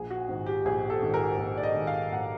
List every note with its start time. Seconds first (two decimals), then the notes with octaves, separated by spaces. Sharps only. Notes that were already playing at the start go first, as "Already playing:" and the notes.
Already playing: A#1 G#4
0.10 F#4
0.28 G#2 D#3
0.46 G4
0.65 A#1 G#4
0.90 A4
1.02 G#2 D#3
1.14 A#4
1.38 A#1
1.57 D5
1.63 D#5
1.75 G#2 D#3
1.87 F5
2.12 A#1 F#5